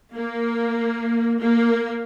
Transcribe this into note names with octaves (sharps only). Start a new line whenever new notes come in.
A#3
A#3